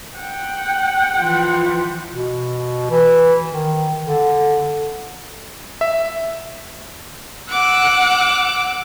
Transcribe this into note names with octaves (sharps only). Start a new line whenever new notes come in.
F#5 G5
E3 F3
B2
E3
D#3
D3
E5
F#5 D6 E6 F#6